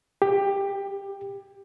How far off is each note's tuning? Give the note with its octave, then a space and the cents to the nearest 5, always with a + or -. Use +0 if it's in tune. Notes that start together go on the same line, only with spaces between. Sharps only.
G4 +15